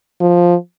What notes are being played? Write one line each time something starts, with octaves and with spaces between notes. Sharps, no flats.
F3